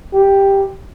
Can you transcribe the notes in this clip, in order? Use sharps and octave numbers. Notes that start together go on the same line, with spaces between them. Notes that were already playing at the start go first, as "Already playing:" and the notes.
G4